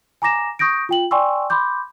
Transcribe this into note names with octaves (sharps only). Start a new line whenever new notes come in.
G#5 A#5 D6 A#6 E7
C#6 D#6 G6 A#6 D7
F4 G5 F#7
D5 G5 G#5 C6 C#6 E6
B5 C6 D6 G6